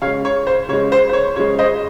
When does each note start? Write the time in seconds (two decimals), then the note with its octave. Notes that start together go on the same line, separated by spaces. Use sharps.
0.02 C#3 C#5 F5
0.07 G#3
0.25 C#5
0.47 C5
0.69 C#3 C#5
0.73 G#3
0.92 C5
1.09 C5
1.13 C#5
1.36 C#3 G#3 C#5
1.59 C5 D#5